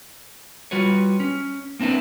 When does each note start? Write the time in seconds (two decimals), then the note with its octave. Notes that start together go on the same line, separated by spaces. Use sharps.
0.71 G3 F4 F#4 B4 C#5
1.20 C#4
1.79 A#3 C4 D4 E4 B4